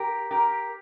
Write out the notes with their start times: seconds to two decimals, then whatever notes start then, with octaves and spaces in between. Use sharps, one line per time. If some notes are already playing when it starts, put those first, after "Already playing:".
Already playing: G4 A#4
0.31 G4 A#4